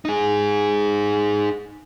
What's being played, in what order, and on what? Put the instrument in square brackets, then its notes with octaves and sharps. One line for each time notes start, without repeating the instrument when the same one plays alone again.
[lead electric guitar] D#4 G#4